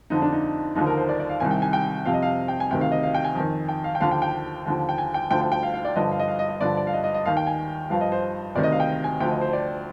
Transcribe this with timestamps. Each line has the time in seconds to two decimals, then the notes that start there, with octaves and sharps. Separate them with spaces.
0.10 F2 D3 F3 D#4
0.22 D4
0.32 D#4
0.75 D#2 D3 F3 D#4
0.86 A#4
0.97 C5
1.09 D5
1.20 D5
1.29 F5
1.40 C2 C3 D#3 G#5
1.51 G5
1.62 G#5
1.73 G5
2.05 F2 C3 F3 F5
2.13 D#5
2.22 F5
2.48 G5
2.60 G#5
2.71 D2 C3 D#3 G5
2.81 F5
2.92 D#5
3.03 F5
3.14 G5
3.24 G#5
3.35 F2 D#3
3.69 G5
3.84 F5
3.95 G5
4.00 D#2 D3 F3 F5
4.11 G5
4.22 G5
4.66 D#2 D3 F3
4.89 G5
4.98 G#5
5.14 G5
5.30 D2 D3 F3 G5
5.41 G5
5.52 G5
5.63 F5
5.74 F5
5.85 D5
5.96 G2 D3 F3 D#5
6.11 F5
6.20 D#5
6.28 F5
6.39 D#5
6.49 D#5
6.60 G2 D3 F3 D5
6.77 D5
6.87 F5
6.93 D#5
7.04 D#5
7.14 D#5
7.26 D#2 D#3 F5
7.37 G5
7.47 G#5
7.90 G2 F3 F5
8.01 D#5
8.12 C5
8.55 D2 C3 D#3 D5
8.63 D#5
8.72 F5
8.80 G5
9.04 G#5
9.20 D2 D3 F3 G5
9.31 D#5
9.41 C5
9.53 D5